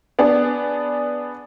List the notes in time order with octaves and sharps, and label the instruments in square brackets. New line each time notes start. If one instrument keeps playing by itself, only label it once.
[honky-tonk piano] B3 D4 G#4